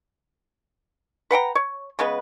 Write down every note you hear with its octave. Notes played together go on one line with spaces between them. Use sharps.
B4 F#5 G5 A#5
C#5
C#3 G#3 B3 B4